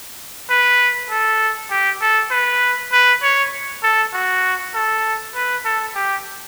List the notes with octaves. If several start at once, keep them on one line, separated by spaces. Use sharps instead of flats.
B4
A4
G4
A4
B4
B4
C#5
A4
F#4
A4
B4
A4
G4